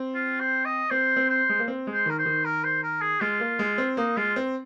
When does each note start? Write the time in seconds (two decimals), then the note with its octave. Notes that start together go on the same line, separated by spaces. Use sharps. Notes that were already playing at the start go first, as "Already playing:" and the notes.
Already playing: C4
0.15 F4
0.40 C5
0.65 D#5
0.90 C4 C5
1.16 C4
1.29 C5
1.49 G#3
1.59 A#3
1.68 C4
1.87 G#3
1.93 C5
2.06 D#3 A#4
2.19 C5
2.25 D#3
2.45 A#4
2.64 C5
2.83 A#4
3.01 G#4
3.21 G#3 F4
3.40 A#3
3.59 G#3
3.78 C4
3.97 A#3 D#4
4.17 G#3 F4
4.36 C4